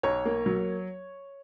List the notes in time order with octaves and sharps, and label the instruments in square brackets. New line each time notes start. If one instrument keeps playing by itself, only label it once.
[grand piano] B1 C#5
A#3
F#3